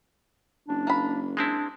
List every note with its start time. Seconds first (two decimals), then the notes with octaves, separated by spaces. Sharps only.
0.68 F#1 D4
0.87 A#3 B5
1.37 G#3 C4 D4 E4